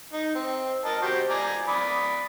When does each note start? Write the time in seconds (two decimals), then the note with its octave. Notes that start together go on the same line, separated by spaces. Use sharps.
0.13 D#4
0.35 C4
0.85 A#4 D#5 A5
1.02 F#4 G4 C5
1.30 D5 G#5 A#5
1.68 D5 B5 D#6